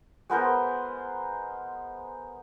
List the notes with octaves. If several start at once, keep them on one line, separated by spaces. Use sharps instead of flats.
G#3 B3 A#4 C5